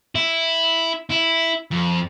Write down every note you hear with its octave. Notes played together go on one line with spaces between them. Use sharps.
E4
E4
F2